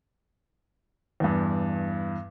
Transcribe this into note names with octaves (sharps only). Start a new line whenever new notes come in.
E2 G2